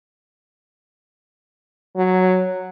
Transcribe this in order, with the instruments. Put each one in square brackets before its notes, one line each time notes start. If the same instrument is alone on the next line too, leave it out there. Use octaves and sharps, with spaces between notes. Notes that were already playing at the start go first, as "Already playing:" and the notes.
[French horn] F#3